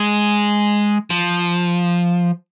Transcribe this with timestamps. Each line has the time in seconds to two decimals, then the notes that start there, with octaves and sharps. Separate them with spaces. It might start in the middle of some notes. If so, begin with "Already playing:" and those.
Already playing: G#3
1.10 F3